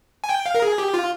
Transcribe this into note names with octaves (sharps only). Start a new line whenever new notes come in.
G#5
G5
F5
A#4
G#4
G4
F4